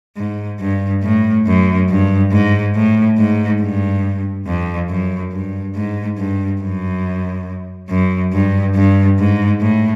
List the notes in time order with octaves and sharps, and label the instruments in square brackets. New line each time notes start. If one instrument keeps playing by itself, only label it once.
[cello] G#2
G2
A2
F#2
G2
G#2
A2
G#2
G2
F2
F#2
G2
G#2
G2
F#2
F#2
G2
G2
G#2
A2